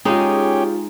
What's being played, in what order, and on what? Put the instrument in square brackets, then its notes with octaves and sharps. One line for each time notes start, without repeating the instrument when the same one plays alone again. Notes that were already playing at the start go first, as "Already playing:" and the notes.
[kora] G#3 D#4 [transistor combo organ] C#4 G4 [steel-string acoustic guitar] F4 G#4